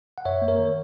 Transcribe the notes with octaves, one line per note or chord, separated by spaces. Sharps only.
F#5
F#2 C#5 E5
A#3
A#4 C#5
D#3